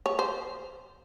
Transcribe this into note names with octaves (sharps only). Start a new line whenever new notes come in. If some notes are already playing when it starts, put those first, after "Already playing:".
C#5
C5